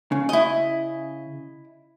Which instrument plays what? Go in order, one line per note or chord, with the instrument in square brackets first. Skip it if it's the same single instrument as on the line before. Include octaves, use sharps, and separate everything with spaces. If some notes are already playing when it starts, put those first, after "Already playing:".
[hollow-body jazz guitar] C#3
[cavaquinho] E4 D#5